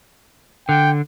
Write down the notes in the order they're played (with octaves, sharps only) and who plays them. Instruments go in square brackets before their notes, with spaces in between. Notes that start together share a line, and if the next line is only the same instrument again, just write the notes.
[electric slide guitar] D3 [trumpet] G5